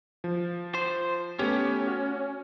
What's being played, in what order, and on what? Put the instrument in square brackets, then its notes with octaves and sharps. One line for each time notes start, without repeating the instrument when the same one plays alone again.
[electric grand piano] F3
[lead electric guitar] C5
[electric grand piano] A3 B3 G4 [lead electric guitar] C#4
[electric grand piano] F#4